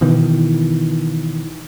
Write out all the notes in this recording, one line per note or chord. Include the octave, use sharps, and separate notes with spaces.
B2 D#3 E3